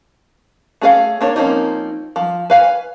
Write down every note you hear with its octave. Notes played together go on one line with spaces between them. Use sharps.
A3 C#4 G#4 D5 F5
A#3 D4 C#5
F3 A#3 C4 C#4 D#4
F3
B4 F5 G#5